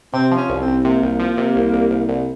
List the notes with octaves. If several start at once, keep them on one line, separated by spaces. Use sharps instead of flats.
C3 C4
F3
C#4
C2
C4
C2
C3 A#3
C2
F3
C3
C2
C2
C2
C2